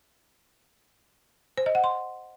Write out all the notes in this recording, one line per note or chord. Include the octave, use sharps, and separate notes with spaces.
C5
D#5
F#5
C6